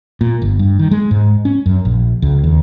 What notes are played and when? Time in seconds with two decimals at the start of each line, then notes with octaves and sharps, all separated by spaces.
0.21 A#2
0.42 G1
0.59 G2
0.79 D#3
0.91 G#3
1.11 G#2
1.45 C#4
1.66 F#2
1.85 A#1
2.22 C#2
2.44 D#2